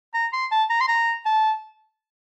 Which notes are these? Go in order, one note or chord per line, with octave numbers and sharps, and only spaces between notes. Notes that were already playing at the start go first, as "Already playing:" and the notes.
A#5
C6
A5
A#5
C6
A#5
A5